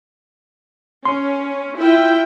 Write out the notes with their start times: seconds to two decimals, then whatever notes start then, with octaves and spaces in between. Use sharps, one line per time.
1.05 C#4 C6
1.78 E4 F4 G5